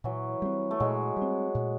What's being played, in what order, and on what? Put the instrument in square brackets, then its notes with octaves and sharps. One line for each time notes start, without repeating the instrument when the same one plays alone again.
[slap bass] A#2 [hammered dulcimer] E3 F#3
[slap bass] G3 C4
[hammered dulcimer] A3
[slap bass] A#2 [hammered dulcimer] F#3 G#3
[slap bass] G3
C4
A#2